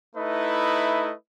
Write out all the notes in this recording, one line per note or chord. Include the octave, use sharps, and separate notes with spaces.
A3 D#4 E4 B4 D#5